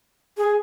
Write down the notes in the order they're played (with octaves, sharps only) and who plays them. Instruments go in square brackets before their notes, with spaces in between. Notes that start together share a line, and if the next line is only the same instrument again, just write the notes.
[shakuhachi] G#4